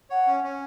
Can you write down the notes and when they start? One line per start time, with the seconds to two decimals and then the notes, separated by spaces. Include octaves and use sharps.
0.10 C#5 F#5
0.27 C#4
0.44 C#4